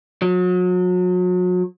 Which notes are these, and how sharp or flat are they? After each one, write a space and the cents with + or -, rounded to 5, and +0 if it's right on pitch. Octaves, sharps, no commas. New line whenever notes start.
F#3 -35